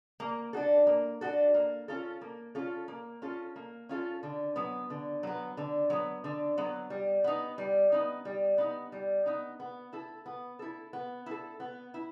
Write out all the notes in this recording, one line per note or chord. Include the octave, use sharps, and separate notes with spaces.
A#3
D4 F#4 A4
A#3
D4 F#4 A4
A#3
C#4 F4 A4
A#3
C#4 F4 A4
A#3
C#4 F4 A4
A#3
C#4 F4 A4
D3
F#3 B3
D3
F#3 B3
D3
F#3 B3
D3
F#3 B3
G3
B3 D#4
G3
B3 D#4
G3
B3 D#4
G3
B3 D#4
B3
E4 A4
B3
E4 A4
B3
E4 A4
B3
E4